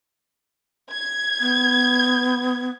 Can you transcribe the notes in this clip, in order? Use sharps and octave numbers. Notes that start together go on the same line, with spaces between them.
G#6
B3